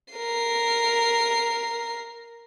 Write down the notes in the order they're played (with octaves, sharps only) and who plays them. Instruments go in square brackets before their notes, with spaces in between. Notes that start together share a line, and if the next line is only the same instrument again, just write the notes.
[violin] A#4 C7